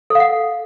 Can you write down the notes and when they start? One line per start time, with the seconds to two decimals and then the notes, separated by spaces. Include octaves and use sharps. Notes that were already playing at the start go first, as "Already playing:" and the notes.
0.10 A4
0.15 F5
0.20 F#5